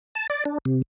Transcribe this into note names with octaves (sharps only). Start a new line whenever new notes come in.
A5
D5
D4
C3